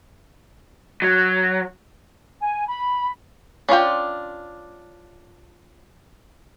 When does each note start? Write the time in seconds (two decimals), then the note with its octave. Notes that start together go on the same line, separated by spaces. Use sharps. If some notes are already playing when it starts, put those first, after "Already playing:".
1.02 F#3
2.41 G#5
2.67 B5
3.69 C#4 D4 F4 G5